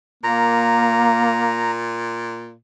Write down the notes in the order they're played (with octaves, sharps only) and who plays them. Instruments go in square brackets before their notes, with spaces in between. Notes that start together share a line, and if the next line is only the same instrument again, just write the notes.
[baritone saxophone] A#2 [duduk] A#3 [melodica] A#5